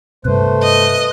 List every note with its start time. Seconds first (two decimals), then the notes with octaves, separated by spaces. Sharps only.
0.25 G2 C3 A3 B4 C5
0.63 D#5